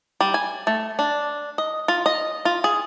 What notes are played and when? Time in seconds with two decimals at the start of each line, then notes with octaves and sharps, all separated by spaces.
0.21 G3
0.34 G#5
0.67 A3
0.99 D4
1.58 D#5
1.88 F4
2.06 D#5
2.45 F4
2.64 G#4